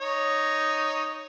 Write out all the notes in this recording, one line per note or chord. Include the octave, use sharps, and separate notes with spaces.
D#4 C#5